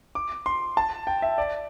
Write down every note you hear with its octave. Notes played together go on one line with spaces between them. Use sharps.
D6
C6
A5
G5
E5
D5